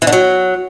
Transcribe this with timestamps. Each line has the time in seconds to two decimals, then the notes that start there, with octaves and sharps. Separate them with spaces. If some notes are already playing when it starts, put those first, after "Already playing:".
0.02 E3
0.07 D3
0.12 F#3